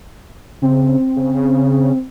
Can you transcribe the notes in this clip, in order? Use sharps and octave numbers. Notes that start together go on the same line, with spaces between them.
C#3 C4
C#3